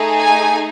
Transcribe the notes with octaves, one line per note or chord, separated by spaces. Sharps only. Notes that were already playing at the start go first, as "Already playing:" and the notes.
Already playing: A3 D#4 G#4
G#5